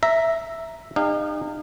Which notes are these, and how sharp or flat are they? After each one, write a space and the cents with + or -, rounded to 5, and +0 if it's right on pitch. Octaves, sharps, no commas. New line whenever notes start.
E5 +0 A#5 +0
D#4 -35 G4 +45 F5 +0